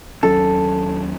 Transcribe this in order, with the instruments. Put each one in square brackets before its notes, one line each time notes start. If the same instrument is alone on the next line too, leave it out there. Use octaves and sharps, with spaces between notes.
[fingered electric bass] D#2 F#3 C#4 [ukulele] A4